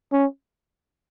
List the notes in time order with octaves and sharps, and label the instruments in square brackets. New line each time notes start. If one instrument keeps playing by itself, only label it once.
[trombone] C#4